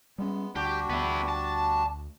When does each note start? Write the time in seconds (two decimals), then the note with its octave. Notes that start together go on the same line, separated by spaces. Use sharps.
0.18 G3 G#3 B3 C#4
0.55 D2 G3 D4 F#4 G4
0.90 D2 B3 E4
1.29 A5